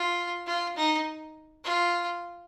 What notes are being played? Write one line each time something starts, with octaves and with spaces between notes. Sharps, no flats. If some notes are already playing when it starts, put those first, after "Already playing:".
Already playing: F4
F4
D#4
F4